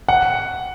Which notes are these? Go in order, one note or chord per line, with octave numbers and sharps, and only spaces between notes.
F#5